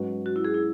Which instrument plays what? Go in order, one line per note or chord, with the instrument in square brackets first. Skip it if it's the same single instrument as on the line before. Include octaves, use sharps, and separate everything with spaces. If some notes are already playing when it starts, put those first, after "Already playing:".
Already playing: [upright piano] G#2 F#3 C#4 F#4 B4
[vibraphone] F#4
E4
G#4
E4